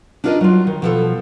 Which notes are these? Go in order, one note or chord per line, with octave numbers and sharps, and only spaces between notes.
D4 D#4 F4 A#4 C#5 D#5
F#3 F4
D#3
B2 F3 A4